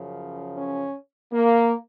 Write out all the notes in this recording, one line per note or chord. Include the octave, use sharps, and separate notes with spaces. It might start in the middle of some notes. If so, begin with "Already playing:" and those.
Already playing: F#2 C#3 F3
C#4
A#3